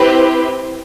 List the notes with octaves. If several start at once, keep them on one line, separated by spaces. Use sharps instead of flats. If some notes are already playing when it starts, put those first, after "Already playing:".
Already playing: C4 E4 G4 B4